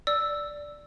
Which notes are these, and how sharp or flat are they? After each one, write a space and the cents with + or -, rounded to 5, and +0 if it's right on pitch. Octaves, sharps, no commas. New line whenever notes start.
D5 +0 E6 +0